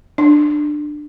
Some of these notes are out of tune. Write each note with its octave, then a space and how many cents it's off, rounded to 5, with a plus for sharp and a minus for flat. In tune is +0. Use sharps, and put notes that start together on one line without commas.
D4 +20